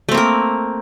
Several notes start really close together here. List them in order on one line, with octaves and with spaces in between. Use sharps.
A3 C4 A#3 A#4